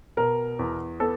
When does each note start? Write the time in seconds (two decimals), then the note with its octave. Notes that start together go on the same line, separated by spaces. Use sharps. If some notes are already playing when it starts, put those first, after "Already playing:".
0.17 B2 A#4
0.59 E2
1.00 B3 A4